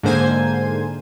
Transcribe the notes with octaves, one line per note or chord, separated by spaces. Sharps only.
G#2 D3 A#3 C5 G#5 G#6